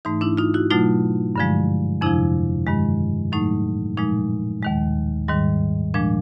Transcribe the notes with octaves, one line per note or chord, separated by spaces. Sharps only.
G#2 E3 A3 D#4
D4 E4
D#4 F4
E4 F#4
B2 F#3 A3 D#4 F4
G2 D3 F3 G#3
F2 C3 F3 D4 E4
G2 D#3 G#3
A2 F#3 A3 D#4
A#2 F3 G#3 D#4
D#2 D#3 G#3
G#2 D#3 G3
A#2 F3 G#3 D4